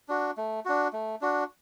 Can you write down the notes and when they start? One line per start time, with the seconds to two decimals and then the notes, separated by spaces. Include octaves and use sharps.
0.08 D4 F#4
0.37 A3
0.65 D4 F#4
0.93 A3
1.21 D4 F#4